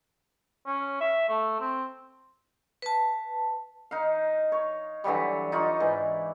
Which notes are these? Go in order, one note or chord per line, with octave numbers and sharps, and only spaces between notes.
C#4
E5
A3
C4
B4 A5
D#4 F5
C#5
D3 E3 F#3 G3
D#4 F4 C#5 D5
G#2 E3